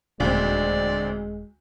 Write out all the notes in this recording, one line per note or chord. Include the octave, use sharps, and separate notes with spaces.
D#1 D2 G#3 C4 D5